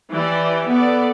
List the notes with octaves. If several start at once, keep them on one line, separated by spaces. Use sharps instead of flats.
E3 G4 D5
B3 A4 D5